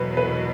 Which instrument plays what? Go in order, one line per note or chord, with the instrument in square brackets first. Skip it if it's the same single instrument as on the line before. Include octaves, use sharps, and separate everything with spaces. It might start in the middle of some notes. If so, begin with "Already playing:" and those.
Already playing: [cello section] E2 B2 F#3 [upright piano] B4
[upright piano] B4